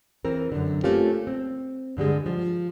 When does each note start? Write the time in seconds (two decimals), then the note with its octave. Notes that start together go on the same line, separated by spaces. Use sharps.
0.25 E3 C4 A#4
0.52 F#2 D3
0.84 A3 A#3 C4 C#4 F4 G4
1.27 C4
1.97 G2 D3 G3 G#3
2.26 F3